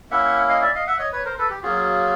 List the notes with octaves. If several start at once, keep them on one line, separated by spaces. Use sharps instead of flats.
A#3 C#4 E4 E5 F#5
D#5 F5
D5 E5
D#5 F5
E5 F#5
C#5 D#5
B4 C#5
A#4 C5
A4 B4
G4
F#3 A#3 C#4 F4 F#4 G#4